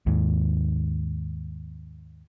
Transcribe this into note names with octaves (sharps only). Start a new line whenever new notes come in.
D#2 G#2